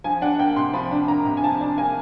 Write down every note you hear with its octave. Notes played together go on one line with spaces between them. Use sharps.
F3 G#5
D4 F#5
A#3 G5
C3 C6
F3 B5
D4
A#3 A#5
C3
G#5
F3 A5
D4
A#3 G#5